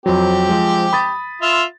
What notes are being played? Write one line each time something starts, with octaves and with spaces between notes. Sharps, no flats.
F2 F#3 C4 G4
F3 G#3
B5 D#6 A6
F4 E5 C6